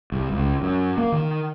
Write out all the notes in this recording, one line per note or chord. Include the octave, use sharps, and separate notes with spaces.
C2
C#2
F#2
A#3
D#3